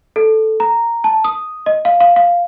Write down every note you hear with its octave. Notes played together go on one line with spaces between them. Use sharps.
A4
A#5
A5
D#6
D#5
F5
F5
F5